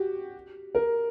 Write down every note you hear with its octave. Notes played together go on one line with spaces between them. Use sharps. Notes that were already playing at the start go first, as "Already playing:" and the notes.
Already playing: F#4 G4
A#4